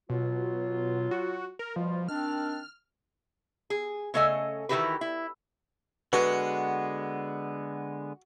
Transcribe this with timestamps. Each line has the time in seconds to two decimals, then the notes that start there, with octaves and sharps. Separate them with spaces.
0.10 B2 F#3 F4
1.11 F#4
1.59 A#4
1.76 B2 F3 G3 F4
2.08 D#3 C4 D4 F6
3.70 G#4
4.14 C#3 A3 C#4 A4 D#5 G#5
4.69 D#3 E3 E4 F#4 G4 B4
5.01 E4
6.13 D3 G#3 B3 F#4 B4